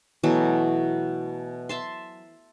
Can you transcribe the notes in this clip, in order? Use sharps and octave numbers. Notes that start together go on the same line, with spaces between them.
B2 E3 F#3 A3
E5 A5 C6